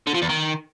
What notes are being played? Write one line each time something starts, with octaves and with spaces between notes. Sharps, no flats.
D3
F3
E2
D#3